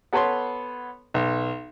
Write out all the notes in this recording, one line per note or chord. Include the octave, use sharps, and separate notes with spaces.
B3 A4 B4 C#5 B5 C6
B1